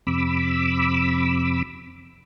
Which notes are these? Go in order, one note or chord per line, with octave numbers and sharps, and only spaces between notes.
F2 C3 B5 D6 E6